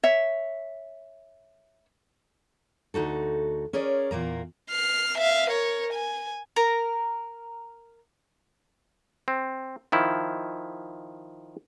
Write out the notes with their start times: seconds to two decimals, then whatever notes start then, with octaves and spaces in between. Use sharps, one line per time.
0.03 C#5 E5
2.94 D2 D#4 F#4 A4
3.73 C#4 G#4 A#4 C#5 D5
4.11 E2 A#2 A#3 A#5
4.70 F6 C7
5.18 E5 F5
5.50 A#4 C#5
5.93 G#5
6.56 A#4 A#5
9.28 C4
9.92 D#3 F3 E4